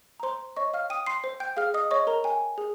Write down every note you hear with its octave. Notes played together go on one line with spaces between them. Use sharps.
A#5
C5 C6
C#5 D#5 C#6
F5 F6
G5 D#6 D#7
C6 C7
C5
G5 G6
G#4 F5 F6
D#5 D#6
C#5 D#5 C#6
A#4 A#5
G5 G#5
G#4